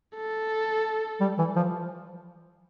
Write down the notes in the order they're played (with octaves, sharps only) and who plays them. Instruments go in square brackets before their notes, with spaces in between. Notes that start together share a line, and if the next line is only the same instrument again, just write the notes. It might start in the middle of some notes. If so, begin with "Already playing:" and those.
[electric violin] A4
[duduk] G3
E3
F3